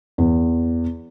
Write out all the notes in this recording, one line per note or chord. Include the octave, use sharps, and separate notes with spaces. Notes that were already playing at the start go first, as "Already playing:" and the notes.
E2